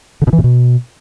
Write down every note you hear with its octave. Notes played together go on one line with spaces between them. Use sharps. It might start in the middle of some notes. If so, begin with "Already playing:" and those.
D3
B2
E3
A2
B2